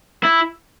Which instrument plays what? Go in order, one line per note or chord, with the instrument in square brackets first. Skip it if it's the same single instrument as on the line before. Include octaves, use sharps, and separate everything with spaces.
[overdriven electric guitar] E4